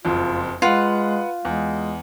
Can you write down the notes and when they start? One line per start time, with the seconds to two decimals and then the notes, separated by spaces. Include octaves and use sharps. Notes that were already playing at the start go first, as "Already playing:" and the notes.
0.05 F#1 F2 F4
0.62 G#3 F4 B4 F#5
1.45 E2 G#3